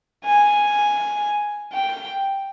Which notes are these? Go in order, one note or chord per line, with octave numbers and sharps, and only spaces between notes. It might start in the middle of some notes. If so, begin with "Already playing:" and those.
G#5
G5